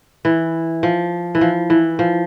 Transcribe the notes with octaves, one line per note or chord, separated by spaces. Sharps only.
E3
F3
E3
F3
E3
F3